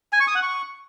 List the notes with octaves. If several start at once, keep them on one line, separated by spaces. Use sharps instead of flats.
G#5
C#6
D#6
F#5
C#6